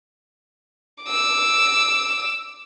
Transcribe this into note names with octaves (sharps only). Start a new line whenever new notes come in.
D6 E6